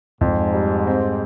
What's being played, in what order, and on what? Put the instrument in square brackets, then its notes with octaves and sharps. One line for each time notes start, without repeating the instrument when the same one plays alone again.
[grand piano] F2 [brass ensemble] G#2
[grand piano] G3
C4